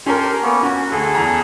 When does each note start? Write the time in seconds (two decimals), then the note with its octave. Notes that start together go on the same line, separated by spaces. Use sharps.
0.06 C#4 G4 A4 A#4 C6
0.43 A#3 B3 C#4
0.63 C#4 F#4
0.92 D2 G#4 A4
1.15 E2 A#5